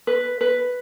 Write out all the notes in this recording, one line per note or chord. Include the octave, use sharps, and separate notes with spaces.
B4
B4